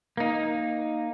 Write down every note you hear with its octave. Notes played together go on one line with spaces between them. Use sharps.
A#3 D#4